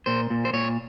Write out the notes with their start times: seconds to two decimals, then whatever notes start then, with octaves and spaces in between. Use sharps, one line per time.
0.06 A#2 C5
0.30 A#2
0.45 C5
0.53 A#2 C#5